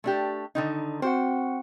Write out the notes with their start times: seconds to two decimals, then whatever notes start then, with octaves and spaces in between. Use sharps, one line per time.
0.04 A3 D4 G4
0.55 D3 D#3 D#4
1.02 C4 F#4 C5 F#5